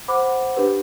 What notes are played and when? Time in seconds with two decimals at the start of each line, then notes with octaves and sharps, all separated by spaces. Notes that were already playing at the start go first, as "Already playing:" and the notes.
0.08 C5 F#5 B5 D6
0.56 D4 G4 B4